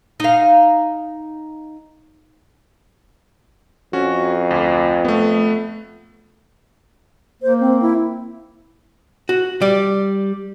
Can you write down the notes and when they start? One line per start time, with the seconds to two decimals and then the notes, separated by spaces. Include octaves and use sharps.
0.20 D#4 F5
3.93 F2 C#4 F#4
4.51 D2
5.05 A3 B3
7.42 A#3 C5
7.60 C4
7.82 E4
9.29 F#4
9.61 G3 D5